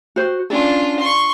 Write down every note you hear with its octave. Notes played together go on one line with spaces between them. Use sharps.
F#4 C5
C#4 D4 F4 A4
C6 C#6